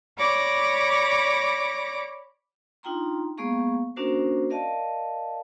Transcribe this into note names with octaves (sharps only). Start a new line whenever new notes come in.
C#5 D5 B5 D6 A#6
D4 D#4 F4 G5 A#5 C6
G#3 A#3 B3 G#4 F5 C#6
A#3 C#4 D4 F#4 A#4 C5
A#4 D5 D#5 F5 A5